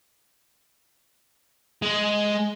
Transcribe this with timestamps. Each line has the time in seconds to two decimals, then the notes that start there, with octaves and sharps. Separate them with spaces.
1.82 G#3